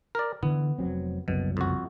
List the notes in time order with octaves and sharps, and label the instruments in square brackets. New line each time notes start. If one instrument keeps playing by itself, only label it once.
[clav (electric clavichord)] A#4 D5
[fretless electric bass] D3 E3 [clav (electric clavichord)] B3
[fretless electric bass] F1 F#3 C4
[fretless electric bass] F#1 C2 F#2 [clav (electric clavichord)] B2
[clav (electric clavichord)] F2 F#4